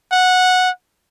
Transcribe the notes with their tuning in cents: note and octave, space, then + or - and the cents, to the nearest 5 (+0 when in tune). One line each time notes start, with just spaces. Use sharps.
F#5 -10